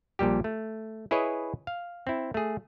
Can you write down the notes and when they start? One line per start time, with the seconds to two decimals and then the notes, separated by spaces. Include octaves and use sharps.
0.19 A#1 A#2 G3 G4
0.44 A3
1.11 E4 G#4 B4 C#5 D#5
1.67 F5
2.07 C4 E4
2.34 A3 G#4